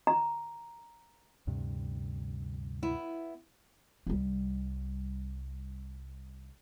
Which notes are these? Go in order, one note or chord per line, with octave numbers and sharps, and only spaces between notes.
A#5
D2 G2 C3
B3 E4
C2 G3